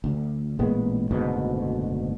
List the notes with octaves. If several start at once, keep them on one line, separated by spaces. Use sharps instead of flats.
D2
A1 A#2 G#3 B3
F#1 D2 G#2 B2